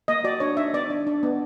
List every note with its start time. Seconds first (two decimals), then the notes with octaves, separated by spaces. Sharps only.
0.08 A#3 D#5
0.24 F#4 D5
0.40 D4 C#5
0.57 D#4 E5
0.74 B3 D5
0.90 D4
1.07 D4
1.23 B3